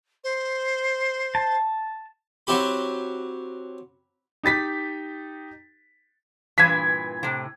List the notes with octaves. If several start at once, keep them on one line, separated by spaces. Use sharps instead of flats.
C5
A5
F#3 C4 E4 G4 B5
D#4 G4 A6 B6
G2 A#2 E3 G#6 B6
A2 C3